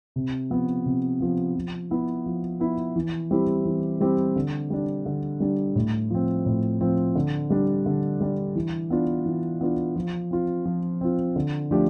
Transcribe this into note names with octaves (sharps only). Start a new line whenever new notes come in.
C3
F3 B3
C3
F3 B3
F3
B3 E4
F3
B3 E4
E3
G3 C4 E4 G4
E3
G3 C4 E4 G4
D3
G3 D4
D3
G3 D4
A2
F3 C4
A2
F3 C4
D3
G3 D4
D3
G3 D4
E3
B3 D4 F4
E3
B3 D4 F4
F3
C4 F4
F3
C4 F4
D3
F3 A3 D4 G4